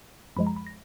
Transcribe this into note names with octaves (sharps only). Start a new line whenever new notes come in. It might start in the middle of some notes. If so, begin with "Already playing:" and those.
F#2 F3 G#3 B5
A#5
B5
A#6